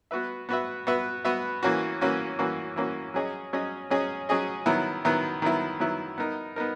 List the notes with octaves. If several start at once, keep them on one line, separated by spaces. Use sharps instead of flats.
B3 F#4 B4 E5
B3 F#4 B4 E5
B3 F#4 B4 E5
B3 F#4 B4 E5
E3 A#3 C#4 F#4
E3 A#3 C#4 F#4
E3 A#3 C#4 F#4
E3 A#3 C#4 F#4
F#3 C#4 G#4 D#5
F#3 C#4 G#4 D#5
F#3 C#4 G#4 D#5
F#3 C#4 G#4 D#5
D#3 F#3 B3 E4
D#3 F#3 B3 E4
D#3 F#3 B3 E4
D#3 F#3 B3 E4
B3 D#4 A#4
B3 D#4 A#4